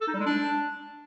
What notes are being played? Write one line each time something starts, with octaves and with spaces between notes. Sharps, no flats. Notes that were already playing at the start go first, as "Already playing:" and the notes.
A4
D#4
G3
G#3
D4